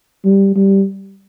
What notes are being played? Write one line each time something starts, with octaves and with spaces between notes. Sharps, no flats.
G3
G3